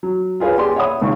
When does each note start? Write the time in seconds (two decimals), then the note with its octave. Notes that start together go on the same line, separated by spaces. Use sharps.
0.03 F#3
0.40 F4 G#4 B4 C#5 F5
0.58 G4 G#4 D5 C6
0.76 C#5 E5 F#5 B5 D#6
1.01 G#1 C#2 C#3 C#5 C#6